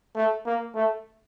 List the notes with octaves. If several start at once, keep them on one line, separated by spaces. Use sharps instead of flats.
A3
A#3
A3